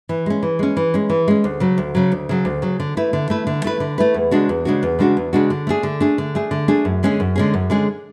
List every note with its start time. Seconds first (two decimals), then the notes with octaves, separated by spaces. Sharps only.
0.09 E3
0.26 G#3 C#4
0.43 E3
0.59 G#3 C#4
0.77 E3
0.94 G#3 C#4
1.10 E3
1.28 G#3 C#4
1.44 D2
1.60 C#3 F#3
1.78 D2
1.95 C#3 F#3
2.12 D2
2.29 C#3 F#3
2.45 D2
2.62 C#3 F#3
2.80 D3
2.97 A3 E4 B4
3.13 D3
3.30 A3 E4 B4
3.47 D3
3.64 A3 E4 B4
3.80 D3
3.98 A3 E4 B4
4.14 E2
4.31 C#3 G#3 D4 F#4
4.49 E2
4.65 C#3 G#3 D4 F#4
4.83 E2
4.99 C#3 G#3 D4 F#4
5.17 E2
5.33 C#3 G#3 D4 F#4
5.50 D3
5.67 A3 D4 G#4
5.83 D3
6.00 A3 D4 G#4
6.18 D3
6.35 A3 D4 G#4
6.51 D3
6.68 A3 D4 G#4
6.85 F#2
7.03 D3 G#3 C#4 G#4
7.20 F#2
7.36 D3 G#3 C#4 G#4
7.54 F#2
7.70 D3 G#3 C#4 G#4